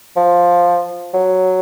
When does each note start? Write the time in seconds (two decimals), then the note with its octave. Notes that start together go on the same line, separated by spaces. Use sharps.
0.16 F3
1.14 F#3